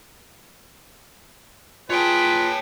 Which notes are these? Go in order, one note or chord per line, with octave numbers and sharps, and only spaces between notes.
F4 G#4 B4 C#5 G5 A5